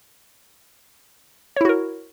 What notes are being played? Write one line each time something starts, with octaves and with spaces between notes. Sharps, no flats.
E4 F#4 A#4 C#5